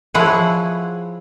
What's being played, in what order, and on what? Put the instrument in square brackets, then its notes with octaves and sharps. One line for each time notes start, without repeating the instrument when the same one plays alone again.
[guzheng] F3 E4 G#4 C#5 F#5 G#5